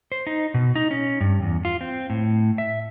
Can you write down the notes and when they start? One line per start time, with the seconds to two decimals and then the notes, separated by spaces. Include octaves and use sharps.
0.12 C5
0.27 D#4
0.54 B2
0.76 D#4
0.91 C#4
1.21 G2
1.42 E2
1.65 F4
1.81 C4
2.10 A2
2.58 E5